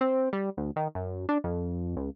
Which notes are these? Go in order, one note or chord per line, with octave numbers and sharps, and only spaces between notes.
C4
G3
D2
D#3
F#2
D4
F2
C#2